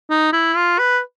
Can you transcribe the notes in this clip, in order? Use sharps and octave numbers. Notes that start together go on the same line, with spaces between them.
D#4
E4
F4
B4